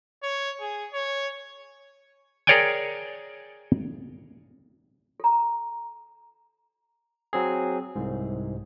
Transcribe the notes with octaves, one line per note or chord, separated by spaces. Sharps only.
C#5
G#4
C#5
G#4 A#4 C#5 D5 G5 G#5
A4 A#5
F#3 C4 G#4
C2 G#2